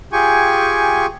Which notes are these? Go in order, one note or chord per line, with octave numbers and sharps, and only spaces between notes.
F4 G4 G#4 G5 G#5 C#6